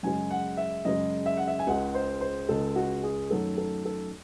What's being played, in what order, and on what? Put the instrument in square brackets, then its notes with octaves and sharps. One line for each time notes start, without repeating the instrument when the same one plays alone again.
[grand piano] F#2 C#3 G#3 G#5
F#5
E5
F#2 C#3 G#3 D#5
E5
F#5
E5
G#5
C#2 C#3 G#3 F#5
C5
C5
C#2 C#3 G#3 A4
F#4
G#4
F#2 D#3 F#3 A3 A4
A4
A4